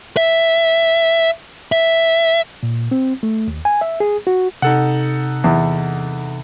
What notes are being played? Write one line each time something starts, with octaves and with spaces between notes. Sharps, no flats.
E5
E5
A#2
C4
A3
D#2
G#5
E5
G#4
F#4
C3 D#4 A4 F#5
E2